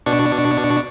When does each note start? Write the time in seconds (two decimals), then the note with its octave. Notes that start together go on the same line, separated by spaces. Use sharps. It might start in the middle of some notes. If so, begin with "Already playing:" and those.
0.06 B2 D4 C#6